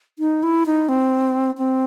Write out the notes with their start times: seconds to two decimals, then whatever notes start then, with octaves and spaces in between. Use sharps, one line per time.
0.19 D#4
0.43 E4
0.66 D#4
0.89 C4
1.58 C4